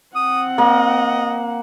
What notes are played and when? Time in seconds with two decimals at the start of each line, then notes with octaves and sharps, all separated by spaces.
0.15 C4 F#5 D#6
0.58 A#3 D#5